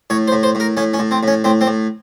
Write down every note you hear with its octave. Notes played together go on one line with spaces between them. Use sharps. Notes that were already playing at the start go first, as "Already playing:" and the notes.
A2 C#5
C5
A2
C5
A2 A#4
A2 C#4
C#4
A2
C4
A2 C#4
A2 C4
C4
A2